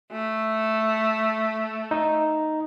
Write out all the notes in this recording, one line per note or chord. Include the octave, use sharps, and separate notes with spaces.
A3
D#4